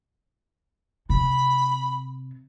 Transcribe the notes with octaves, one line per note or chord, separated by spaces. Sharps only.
C3 B5